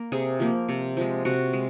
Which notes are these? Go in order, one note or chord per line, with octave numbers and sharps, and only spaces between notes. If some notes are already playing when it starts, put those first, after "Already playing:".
Already playing: A#3
C3 G#4
F3 A#3
C3
F3 G#3
C3 F#4
G#3